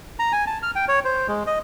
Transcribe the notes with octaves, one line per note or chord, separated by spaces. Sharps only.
A#5
G#5
A5
F6
G5
C#5
C5
G#3
D#5